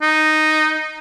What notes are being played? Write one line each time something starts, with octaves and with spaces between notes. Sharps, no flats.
D#4